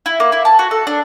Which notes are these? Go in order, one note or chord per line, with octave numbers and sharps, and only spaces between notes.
E4
A#3
E4
A5
F#4
A4
D4